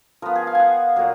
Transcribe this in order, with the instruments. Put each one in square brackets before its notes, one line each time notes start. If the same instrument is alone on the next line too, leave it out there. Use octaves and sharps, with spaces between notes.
[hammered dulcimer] F3 B3 A#4
G#4
F5
G#5
F#5
A#2 F#3 A#3